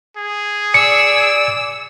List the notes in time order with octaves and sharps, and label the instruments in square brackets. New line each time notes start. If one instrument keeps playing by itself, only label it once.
[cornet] G#4
[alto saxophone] D5 [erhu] E6 [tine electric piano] C#7